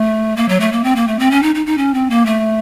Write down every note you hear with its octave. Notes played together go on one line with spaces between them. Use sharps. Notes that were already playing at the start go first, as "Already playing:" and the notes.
Already playing: A3
A#3
F#3
A3
A#3
C4
A#3
A3
C4
C#4
D#4
D#4
D#4
C#4
C4
A#3
A3